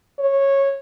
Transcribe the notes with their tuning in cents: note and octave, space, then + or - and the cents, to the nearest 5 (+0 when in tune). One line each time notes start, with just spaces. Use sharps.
C#5 -10